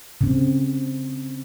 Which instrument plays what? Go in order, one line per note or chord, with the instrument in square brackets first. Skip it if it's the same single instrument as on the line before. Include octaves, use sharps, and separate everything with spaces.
[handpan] C#3 C4